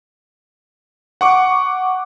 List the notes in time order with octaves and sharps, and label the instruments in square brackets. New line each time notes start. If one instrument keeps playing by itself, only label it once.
[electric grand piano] F#5 C#6 D6